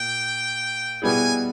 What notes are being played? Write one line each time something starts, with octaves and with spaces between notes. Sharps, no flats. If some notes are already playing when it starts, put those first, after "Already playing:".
Already playing: A#2 G5
B2 G3 B3 E4 G#4 G#5